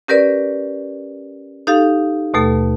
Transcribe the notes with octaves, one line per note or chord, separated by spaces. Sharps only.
C#4 G4 A#4 B4 D5
D#4 G4 A4 F5
D#2 B2 A3 A4